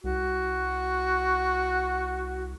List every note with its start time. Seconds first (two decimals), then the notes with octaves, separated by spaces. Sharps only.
0.04 C2 F#4